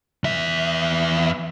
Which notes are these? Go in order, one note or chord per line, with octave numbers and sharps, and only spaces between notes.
E2 E5